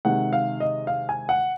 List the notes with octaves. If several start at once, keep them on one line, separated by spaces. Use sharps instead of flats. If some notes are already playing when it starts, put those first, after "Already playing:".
C3 D#3 G#3 F#5
F5
D#5
F5
G#5
F#5